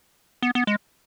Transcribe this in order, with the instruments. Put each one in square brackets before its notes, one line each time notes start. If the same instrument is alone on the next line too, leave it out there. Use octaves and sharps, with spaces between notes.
[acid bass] B3
B3
G#3